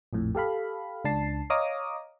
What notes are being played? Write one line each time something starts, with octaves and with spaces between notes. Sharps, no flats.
A#1 F2 A2
G4 A4 F5 B5
C#2 D4 A5 C7
C#5 D#5 F5 A#5 D6 D#6